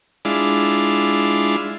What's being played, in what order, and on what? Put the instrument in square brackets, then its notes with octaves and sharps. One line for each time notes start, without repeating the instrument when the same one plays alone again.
[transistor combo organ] G#3 D4 E4 F4